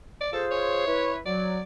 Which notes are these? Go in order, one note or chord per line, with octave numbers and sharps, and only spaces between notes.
D5
F4 G#4 A4 C5
C#5
E4 B4
F#3 D5